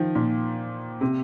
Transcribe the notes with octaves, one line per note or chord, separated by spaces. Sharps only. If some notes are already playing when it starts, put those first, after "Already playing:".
Already playing: D#3 F3
A#2
C3